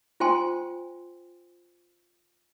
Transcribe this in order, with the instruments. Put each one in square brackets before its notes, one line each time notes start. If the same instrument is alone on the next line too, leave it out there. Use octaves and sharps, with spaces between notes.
[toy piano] F4 C5 G5 G#5 C6